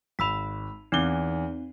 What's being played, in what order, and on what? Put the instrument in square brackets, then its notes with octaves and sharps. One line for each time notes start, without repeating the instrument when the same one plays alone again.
[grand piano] G#1 F7 [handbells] B5 E6 B6
[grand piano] E2 G7 [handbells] C4 D#4